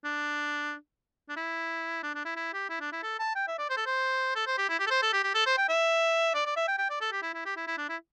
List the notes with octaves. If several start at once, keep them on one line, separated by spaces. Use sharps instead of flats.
D4
D4
E4
D4
D4
E4
E4
G4
E4
D4
E4
A4
A5
G5
E5
D5
C5
A4
C5
A4
C5
G4
E4
G4
A4
C5
A4
G4
G4
A4
C5
G5
E5
D5
D5
E5
G5
G5
D5
A4
G4
E4
E4
G4
E4
E4
D4
E4